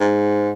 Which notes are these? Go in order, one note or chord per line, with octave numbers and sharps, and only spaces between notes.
G#2